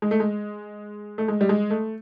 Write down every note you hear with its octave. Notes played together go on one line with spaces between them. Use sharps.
G#3
A3
G#3
A3
G#3
G3
G#3
A3